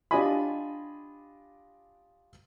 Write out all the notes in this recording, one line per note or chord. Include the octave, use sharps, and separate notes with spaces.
D4 F4 G4 D#5 G#5 B5